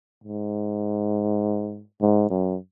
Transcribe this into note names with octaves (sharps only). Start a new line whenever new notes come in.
G#2
G#2
F#2